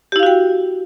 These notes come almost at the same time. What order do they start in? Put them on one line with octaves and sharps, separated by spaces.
G4 E4 F5 F#4 G5